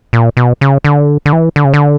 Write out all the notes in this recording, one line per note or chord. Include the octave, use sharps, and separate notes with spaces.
A#2
B2
C#3
D3
D3
E3
D3
C#3
D3